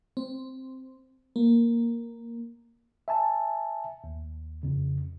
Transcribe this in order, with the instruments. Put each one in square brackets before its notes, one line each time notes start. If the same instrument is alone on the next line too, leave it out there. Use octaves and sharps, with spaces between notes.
[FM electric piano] C4
A#3
[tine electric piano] E5 G#5 A5
D#2
F2 C#3